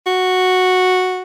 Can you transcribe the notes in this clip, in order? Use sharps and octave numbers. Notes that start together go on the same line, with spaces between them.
F#4